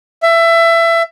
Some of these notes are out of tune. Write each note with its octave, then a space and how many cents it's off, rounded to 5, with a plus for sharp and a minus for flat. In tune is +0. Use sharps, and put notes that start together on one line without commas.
E5 +20